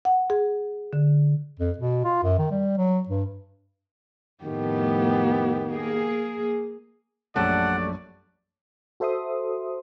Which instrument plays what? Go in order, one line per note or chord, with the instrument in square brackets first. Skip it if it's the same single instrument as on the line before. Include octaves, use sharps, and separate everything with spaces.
[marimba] F#5
G#4
D3
[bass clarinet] F2
B2
F4
F#2
D#3
G3
F#3
G2
[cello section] F2 A2 A3 [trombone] D#3 [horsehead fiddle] B3 G4
[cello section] A#3 G#4
[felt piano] A#1 F#2 A5 [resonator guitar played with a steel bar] G3 A3 [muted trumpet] D5 [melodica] F#5
[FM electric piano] F#4 A4 C5 E5 C6 D#6